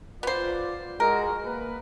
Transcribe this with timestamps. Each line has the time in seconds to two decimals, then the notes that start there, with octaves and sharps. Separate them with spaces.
0.23 B3 F4 C5 D5
1.00 G#3 F#4 A#4
1.45 A#3 B4